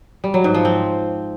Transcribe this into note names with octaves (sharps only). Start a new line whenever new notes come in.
G3
F#3
G#2
F3
C4